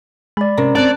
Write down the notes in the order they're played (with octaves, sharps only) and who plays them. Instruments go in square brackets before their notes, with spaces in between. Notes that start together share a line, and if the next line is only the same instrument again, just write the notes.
[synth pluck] G#3 [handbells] D5 B5
[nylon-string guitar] C3 [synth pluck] C#4 A#4 A#5
[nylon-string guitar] C4 C#5 [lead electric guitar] D5 [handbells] A5 F#6